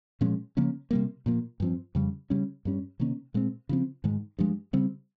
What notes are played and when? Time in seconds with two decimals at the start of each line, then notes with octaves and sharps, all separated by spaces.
0.21 A#2 F3 G#3 C#4
0.57 C#3 F3 A#3 C#4
0.91 C3 G3 A#3
1.26 A#2 F3 A#3
1.60 G2 F3 C4
1.95 F2 C#3 G3
2.30 C#3 G3 C#4
2.65 G2 G3 C#4
3.00 C3 D#3 A#3 C#4
3.34 A#2 G#3 C4
3.69 C#3 F3 C4
4.04 G#2 D#3 G#3
4.39 G2 F3 G#3
4.73 C#3 G3 C4